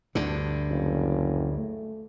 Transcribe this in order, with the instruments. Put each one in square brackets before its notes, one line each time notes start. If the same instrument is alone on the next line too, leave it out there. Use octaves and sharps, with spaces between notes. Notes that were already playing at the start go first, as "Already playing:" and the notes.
[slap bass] D2 G2 D3
[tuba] F#1
A3